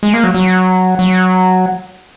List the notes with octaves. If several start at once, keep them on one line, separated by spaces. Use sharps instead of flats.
G#3
A#3
F#3
F#3
F#3